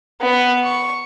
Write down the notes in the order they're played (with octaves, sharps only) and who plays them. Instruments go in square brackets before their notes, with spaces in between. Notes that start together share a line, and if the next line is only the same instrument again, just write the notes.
[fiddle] B3
C#6